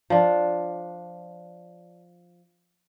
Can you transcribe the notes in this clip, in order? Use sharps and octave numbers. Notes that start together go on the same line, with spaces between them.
F3 D4